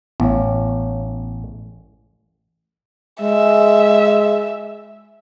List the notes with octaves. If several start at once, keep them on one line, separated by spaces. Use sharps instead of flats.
A1 B3 C#5
G#3 E5